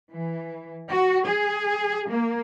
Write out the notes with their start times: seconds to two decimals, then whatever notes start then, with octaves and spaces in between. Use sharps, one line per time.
0.11 E3
0.91 F#4
1.25 G#4
2.09 A#3